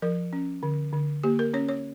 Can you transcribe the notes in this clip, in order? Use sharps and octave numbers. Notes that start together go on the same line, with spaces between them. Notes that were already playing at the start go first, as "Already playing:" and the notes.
F3 A#4
C#4
D3
D3
A#3 G4
A#4
C#4 C#5
C#5